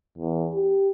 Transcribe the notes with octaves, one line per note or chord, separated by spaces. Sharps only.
E2
G4